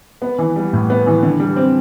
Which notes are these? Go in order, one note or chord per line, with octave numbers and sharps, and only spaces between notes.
B3
E3
G3
A2
B3
E3
D3
G3
C4